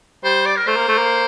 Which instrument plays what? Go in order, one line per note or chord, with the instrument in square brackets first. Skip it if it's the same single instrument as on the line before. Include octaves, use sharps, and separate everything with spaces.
[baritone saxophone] G3 [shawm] C5
[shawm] D5
A#4
[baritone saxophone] A3 [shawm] C5
[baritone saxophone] A#3
A3
A#3